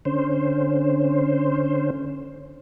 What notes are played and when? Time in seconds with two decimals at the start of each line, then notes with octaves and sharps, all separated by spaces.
0.05 D3 C#4 C5